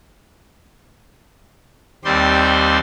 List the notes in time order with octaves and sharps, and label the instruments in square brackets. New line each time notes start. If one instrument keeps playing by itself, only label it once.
[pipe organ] D#2 G3 C4 D5 C6